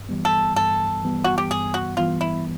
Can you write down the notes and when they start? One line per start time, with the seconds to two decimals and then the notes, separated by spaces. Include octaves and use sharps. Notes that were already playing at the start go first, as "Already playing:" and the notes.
Already playing: G2
0.09 E3 G3 B3
0.25 A4
0.56 G2 A4
1.03 E3 G3 B3
1.24 F#4
1.38 G4
1.51 G2 G#4
1.74 F#4
1.97 E3 G3 B3 F4
2.21 E4